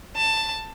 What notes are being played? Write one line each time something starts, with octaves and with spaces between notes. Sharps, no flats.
A5